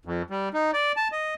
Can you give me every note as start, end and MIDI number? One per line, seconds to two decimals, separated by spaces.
0.05 0.22 41
0.30 0.49 55
0.54 0.71 63
0.73 0.92 74
0.97 1.08 81
1.12 1.34 75